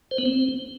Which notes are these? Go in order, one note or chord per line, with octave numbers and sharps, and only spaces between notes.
C5
B3
C4